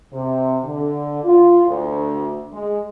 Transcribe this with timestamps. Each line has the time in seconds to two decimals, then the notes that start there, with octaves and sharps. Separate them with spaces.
0.13 C3
0.65 D3
1.25 F4
1.66 D2
2.52 G#3